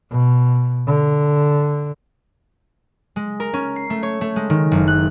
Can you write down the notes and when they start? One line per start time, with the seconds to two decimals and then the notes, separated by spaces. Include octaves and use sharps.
0.11 B2
0.87 D3
3.16 G#3
3.40 A#4
3.54 C#4
3.76 C7
3.90 A3
4.03 C#5
4.21 A3
4.36 G#3
4.50 D#3
4.72 F#1
4.88 F#6